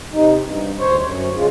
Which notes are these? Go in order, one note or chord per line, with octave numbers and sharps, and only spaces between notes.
C3 D#4
G2
D2 C5 C#5
F#2
C#3 G#3 F4